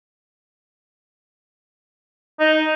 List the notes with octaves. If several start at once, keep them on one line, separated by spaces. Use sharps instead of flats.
D#4